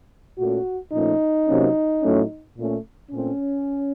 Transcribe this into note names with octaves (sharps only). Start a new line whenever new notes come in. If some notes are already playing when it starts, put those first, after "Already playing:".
A#2 A3 C#4 F#4
A#2 F3 A3 C#4 D#4
C3 F#3 A#3 C#4
A2 F#3 A3 C#4
A#2 A3 C#4
A#2 A3 C4 C#4